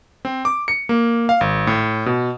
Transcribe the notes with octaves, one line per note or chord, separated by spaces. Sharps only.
C4
D6
C#7
A#3
F5
G#1
A2
B2